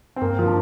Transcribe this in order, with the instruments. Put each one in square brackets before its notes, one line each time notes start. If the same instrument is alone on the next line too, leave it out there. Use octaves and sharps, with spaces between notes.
[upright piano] C4
[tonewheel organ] G2 [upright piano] A#3
[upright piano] F3
[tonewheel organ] D4